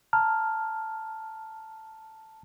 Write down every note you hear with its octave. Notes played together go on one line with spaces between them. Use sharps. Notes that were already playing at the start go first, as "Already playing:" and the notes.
A5 A#5 F6